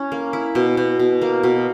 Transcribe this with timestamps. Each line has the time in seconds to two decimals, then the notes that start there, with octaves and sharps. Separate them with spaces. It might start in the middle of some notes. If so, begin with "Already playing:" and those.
Already playing: C#4 E4
0.12 A#3
0.33 E4
0.55 B2
0.77 B2
0.99 B2
1.22 A#3
1.43 B2